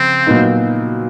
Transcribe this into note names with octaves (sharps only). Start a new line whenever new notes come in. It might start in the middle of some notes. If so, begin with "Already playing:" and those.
Already playing: C#3 F3 C4
A#2 F#3 B3 D#4